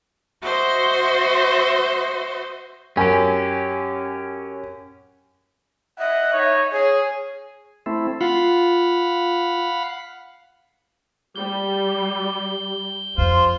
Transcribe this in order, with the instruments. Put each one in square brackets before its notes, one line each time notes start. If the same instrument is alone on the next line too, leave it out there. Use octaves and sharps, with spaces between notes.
[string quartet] F#4 C5 D#5 E5
[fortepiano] F#2 [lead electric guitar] C#4 G4 [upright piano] G#5
[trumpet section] D#5 F#5 [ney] E5
[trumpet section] D#4 C#5
[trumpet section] G#4 [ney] C#5
[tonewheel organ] A3 C4 E4
[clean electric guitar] F4 [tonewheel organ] F5 F#5 B5
[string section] G3 [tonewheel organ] G6
[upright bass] F2 [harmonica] F4 C5